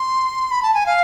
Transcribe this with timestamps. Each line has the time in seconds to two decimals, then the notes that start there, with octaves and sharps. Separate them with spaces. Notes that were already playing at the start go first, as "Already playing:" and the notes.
Already playing: C6
0.51 B5
0.63 A5
0.74 G#5
0.86 F5